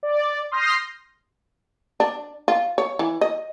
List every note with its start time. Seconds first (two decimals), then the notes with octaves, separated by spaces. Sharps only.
0.03 D5
0.51 C6 D#6 F6 G6 A#6 C7
2.00 D4
2.48 F4
2.78 C#5
2.99 E3
3.21 D#5